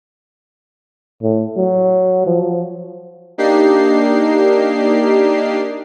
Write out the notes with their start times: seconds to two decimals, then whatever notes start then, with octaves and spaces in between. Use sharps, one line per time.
1.23 A2
1.57 F#3
2.27 F3
3.38 A#3 D4 D#4 G4 C7